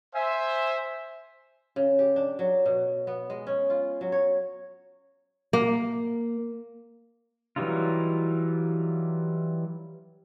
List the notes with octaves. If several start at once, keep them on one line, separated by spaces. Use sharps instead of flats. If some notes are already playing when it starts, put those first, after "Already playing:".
C5 E5 G#5
C#3
G4
D4
F#3
B2
B3
G#3
C#4
F4
F#3
C#5
A#3
E3 F#3 G3 D#4 F4